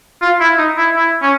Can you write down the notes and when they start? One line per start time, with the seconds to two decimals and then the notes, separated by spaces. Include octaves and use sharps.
0.21 F4
0.40 E4
0.58 D#4
0.77 E4
0.96 E4
1.22 C#4